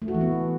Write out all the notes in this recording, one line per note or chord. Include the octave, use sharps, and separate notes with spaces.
A3
F#4
E3
B3